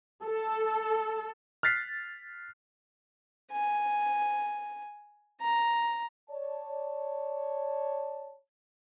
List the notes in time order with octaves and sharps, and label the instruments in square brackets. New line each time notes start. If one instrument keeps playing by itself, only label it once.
[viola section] A4
[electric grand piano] F6 F#6 A6 B6 C7
[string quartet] G#5
A#5
[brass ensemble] C#5 D5 A5